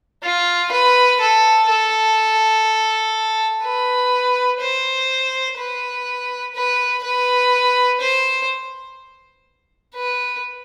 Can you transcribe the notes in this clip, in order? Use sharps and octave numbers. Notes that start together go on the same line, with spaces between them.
F4
B4
A4
A4
B4
C5
B4
B4
B4
C5
B4